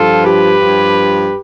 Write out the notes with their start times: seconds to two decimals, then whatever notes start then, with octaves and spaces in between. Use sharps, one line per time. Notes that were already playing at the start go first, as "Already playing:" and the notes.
Already playing: G2 F3 F4 A4
0.24 G4 B4
0.60 G2 F3